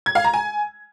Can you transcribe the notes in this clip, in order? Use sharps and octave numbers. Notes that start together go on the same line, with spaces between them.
G#6
F5
A#5
G#5